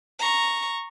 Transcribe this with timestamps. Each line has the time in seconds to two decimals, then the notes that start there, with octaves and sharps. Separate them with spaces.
0.20 A#5 C#6